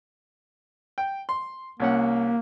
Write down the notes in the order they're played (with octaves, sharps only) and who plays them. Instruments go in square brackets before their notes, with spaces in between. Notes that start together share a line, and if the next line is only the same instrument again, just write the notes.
[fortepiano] G5
C6
[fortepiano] C2 C#4 F#5 [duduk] A#3